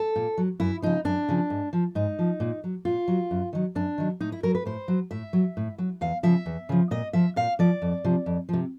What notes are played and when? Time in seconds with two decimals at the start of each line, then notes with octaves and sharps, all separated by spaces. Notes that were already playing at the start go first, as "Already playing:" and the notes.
Already playing: A4
0.16 A#2
0.38 F#3
0.60 F#2 E4
0.82 C#3 F3 D#4
1.05 F#2 D4
1.28 C#3 F3
1.50 G#2
1.73 F3
1.95 G#2 D#4
2.19 F3
2.40 A#2
2.64 F#3
2.85 A#2 F4
3.08 F#3
3.31 F#2
3.53 D#3 F#3
3.75 F#2 D4
3.98 D#3 F#3
4.21 A2 D#4
4.32 E4
4.43 F#3 A#4
4.55 B4
4.65 A2 C5
4.88 F#3
5.11 A2 E5
5.33 F#3
5.57 A2
5.78 F#3
6.01 E2 F5
6.23 C#3 F3 E5
6.46 E2
6.69 C#3 F3
6.91 A#2 D#5
7.13 F3 E5
7.36 A#2 F5
7.59 F3 D5
7.82 F2
8.04 C3 F3
8.26 F2
8.49 C3 F3